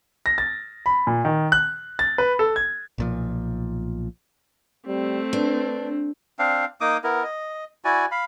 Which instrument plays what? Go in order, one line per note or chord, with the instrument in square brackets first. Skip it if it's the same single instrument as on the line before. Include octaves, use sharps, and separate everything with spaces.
[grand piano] A#6
A6
B5
A#2
D#3
F#6
A6
B4
A4
G#6
[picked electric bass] B1 A#2 F3
[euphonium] G3 [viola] A3 C4
[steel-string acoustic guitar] D4 [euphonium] B4
[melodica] C4 D4 F5
A#3 D#4 D6 D#6
B3 E4 A#4
D#5
E4 F#4 D5 G#5
F5 B5